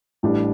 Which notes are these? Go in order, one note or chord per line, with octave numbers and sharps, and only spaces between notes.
A1 A2 G3 D4